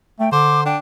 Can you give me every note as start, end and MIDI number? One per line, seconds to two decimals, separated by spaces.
0.20 0.29 57
0.20 0.32 79
0.32 0.76 50
0.32 0.61 72
0.32 0.61 86
0.65 0.78 62
0.65 0.77 79